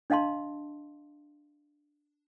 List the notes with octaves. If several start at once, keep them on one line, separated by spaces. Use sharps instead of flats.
D4 D#5 F5 A5 C6